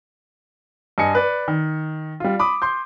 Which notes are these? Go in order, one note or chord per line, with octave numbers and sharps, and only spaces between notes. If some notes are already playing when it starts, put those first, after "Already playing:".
G2 D#5 G#5 C#7
B4 D5
D#3
G3 F4
B5 D6 D#6
C6 G6